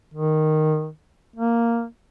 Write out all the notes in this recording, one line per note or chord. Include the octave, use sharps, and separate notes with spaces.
D#3
A#3